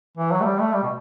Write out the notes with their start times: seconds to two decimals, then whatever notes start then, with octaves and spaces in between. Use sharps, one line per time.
0.17 E3
0.32 F#3
0.41 A3
0.45 G3
0.60 A3
0.73 G3
0.83 B2